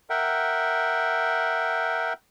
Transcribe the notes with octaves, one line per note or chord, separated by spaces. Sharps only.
A#4 E5 F#5 G5